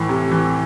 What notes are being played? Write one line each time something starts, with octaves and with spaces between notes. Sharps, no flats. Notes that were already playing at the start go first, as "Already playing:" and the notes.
Already playing: A2 E3
C3
E3